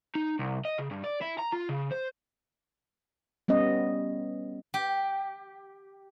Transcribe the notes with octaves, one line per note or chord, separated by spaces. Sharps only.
D#4
C2
D#5
C#3
G2
D5
E4
A#5
F4
C#3
C5
G3 B3 C#4 D#5
G4